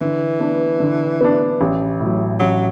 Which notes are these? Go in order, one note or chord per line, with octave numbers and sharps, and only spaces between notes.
D3 E3
B3 D4
D3
B3 D4
A1
A2 F#3
A1 F#3